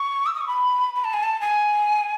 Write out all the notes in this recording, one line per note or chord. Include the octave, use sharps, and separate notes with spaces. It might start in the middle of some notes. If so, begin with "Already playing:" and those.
Already playing: C#6
E6
D#6
C#6
B5
B5
A5
G#5
A5
G#5